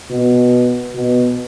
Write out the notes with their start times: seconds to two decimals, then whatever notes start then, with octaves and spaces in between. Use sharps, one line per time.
0.11 B2
0.94 B2